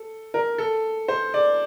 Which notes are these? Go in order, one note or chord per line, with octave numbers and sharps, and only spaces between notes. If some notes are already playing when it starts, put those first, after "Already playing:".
Already playing: A4
A#4
A4
C5
D5